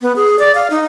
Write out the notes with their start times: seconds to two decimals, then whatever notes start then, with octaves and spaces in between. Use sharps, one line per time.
0.02 B3
0.16 G#4
0.39 D5
0.55 F5
0.70 D#4